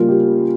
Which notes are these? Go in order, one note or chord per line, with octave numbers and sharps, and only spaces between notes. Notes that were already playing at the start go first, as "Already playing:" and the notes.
Already playing: C#3 G3 A#3 C#4 F4
G4